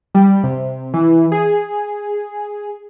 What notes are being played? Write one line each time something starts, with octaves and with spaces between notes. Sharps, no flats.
G3
C3
E3
G#4